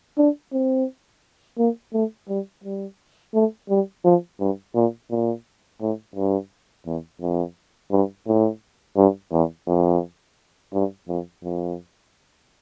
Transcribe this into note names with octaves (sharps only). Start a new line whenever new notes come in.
D4
C4
A#3
A3
G3
G3
A3
G3
F3
G2
A#2
A#2
A2
G2
E2
F2
G2
A2
G2
E2
F2
G2
F2
F2